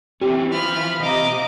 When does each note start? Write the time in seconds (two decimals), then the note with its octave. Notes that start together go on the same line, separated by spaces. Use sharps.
0.22 E3 C4 C#4 G4
0.52 F4 C5 B5 F6
1.03 C3 D#5 F5 A#5 D6